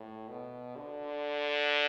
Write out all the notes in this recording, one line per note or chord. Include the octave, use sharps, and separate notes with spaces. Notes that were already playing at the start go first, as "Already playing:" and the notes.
Already playing: A2
B2
D3